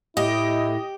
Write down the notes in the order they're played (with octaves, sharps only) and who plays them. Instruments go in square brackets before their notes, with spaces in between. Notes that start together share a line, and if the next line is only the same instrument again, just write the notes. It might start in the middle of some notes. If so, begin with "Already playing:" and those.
[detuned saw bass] A2 [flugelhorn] E4 [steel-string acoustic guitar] G4 [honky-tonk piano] D#5